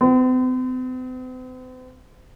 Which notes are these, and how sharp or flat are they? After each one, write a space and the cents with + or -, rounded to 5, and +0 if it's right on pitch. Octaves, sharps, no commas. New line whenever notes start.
C4 -45